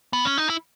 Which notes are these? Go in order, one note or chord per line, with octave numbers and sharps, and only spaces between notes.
B3
C#4
D#4
E4